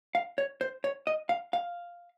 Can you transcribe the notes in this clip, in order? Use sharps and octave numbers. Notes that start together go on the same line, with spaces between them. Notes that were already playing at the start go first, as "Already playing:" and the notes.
F5
C#5
C5
C#5
D#5
F5
F5